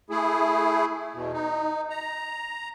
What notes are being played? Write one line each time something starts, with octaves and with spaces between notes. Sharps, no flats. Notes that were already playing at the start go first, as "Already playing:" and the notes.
A3 E4 G#4
E2 B2
D#4
A#5